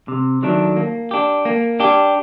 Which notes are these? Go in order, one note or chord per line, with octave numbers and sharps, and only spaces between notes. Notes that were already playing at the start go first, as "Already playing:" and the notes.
C3
D#3 F#3 A3 D4
A#3
D4 G4
A#3
D4 G4